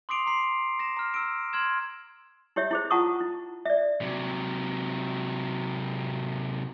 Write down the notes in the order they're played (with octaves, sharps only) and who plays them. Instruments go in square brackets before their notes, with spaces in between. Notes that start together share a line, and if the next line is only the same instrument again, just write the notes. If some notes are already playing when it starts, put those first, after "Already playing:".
[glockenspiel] C6 D6 D#6 C7 D7 F7
A#5 C6 C7
A#6 E7
A#5 F6
E6 D7
C6 F6 G#6 E7
[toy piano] E4 G4 C#5 E5
E4 G#4 C5
F4 F#5 A5 A#5 C#6 D#6
E4
D5 E5
[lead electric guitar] C3 F#3